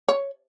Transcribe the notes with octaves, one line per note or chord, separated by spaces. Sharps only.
C#5